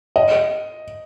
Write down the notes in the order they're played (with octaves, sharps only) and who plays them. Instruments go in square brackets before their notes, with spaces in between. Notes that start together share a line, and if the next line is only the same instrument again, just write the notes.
[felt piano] D#5